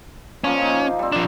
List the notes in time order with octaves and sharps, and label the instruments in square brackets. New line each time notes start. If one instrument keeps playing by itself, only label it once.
[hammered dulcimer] F3 A#3 D#5 [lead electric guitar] C#4
[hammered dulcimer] D#4
G3 C4
[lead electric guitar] F3 D4